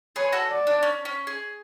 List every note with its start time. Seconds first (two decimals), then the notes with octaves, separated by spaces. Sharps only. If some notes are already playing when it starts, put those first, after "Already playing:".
0.16 G#4 B4 C#5
0.32 F#4 A4
0.50 D5
0.67 D4
0.83 C#4
1.05 C#4
1.27 G#4